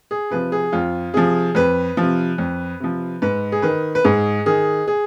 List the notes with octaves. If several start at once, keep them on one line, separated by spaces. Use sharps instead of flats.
G#4
C3 F3 B4
G#4
F2 F4
C3 F3 G#4
F2 B4
C3 F3
F2
C3 F3
G#2 B4
G#4
D#3 B4
B4
G#2 G#4
D#3 G#4
G#4